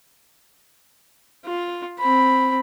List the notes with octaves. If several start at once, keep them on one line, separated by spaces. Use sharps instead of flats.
F4
C4 B5